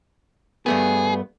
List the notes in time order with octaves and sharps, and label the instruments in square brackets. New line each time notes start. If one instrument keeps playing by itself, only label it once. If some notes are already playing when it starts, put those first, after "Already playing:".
[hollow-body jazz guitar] G2 A3 B3 [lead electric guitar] G#4